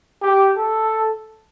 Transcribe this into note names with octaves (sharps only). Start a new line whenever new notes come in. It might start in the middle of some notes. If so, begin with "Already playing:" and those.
G4
A4